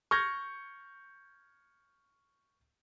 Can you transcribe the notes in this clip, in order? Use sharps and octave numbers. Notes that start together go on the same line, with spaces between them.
C#6 F6 G6 G#6 A#6